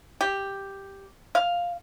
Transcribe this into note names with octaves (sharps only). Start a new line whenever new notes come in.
G4
F5